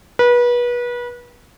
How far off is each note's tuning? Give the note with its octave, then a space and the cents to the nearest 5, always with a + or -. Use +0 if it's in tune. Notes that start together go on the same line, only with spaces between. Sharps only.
B4 -30